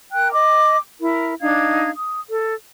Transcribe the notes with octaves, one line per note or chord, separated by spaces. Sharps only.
A#4 G5 F#6
D#5 D6
E4 A#4
D4 D#4 F5 G#6
D#6
A4